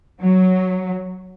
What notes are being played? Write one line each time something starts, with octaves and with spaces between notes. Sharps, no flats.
F#3